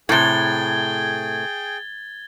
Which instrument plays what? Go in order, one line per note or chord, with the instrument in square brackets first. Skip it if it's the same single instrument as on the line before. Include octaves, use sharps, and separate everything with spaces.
[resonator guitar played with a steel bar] A2 C3 [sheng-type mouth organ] G#4 G5 [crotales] G#6 A6 G7